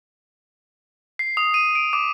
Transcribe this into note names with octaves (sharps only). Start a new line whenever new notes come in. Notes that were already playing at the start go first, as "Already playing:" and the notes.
C7
D#6
D#7
D7
D6